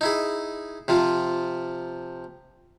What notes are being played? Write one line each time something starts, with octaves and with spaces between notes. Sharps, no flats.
D#4 E4 G#4
C3 F3 F4